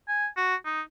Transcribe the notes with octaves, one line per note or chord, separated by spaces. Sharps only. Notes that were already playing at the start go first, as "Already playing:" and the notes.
G#5
F#4
D#4